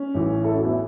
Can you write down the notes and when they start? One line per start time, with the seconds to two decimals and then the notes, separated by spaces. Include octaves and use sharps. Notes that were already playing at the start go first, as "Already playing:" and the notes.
Already playing: C#4
0.14 A1 A2 E3
0.44 E4 A4
0.54 C#4 F#4
0.65 B3 E4